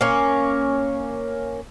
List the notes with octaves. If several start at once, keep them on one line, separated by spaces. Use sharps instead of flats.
A#3 C#4